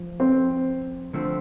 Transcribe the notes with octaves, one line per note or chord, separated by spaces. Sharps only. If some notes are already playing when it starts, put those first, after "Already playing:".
Already playing: F3
C4
D3 F3 A3 C4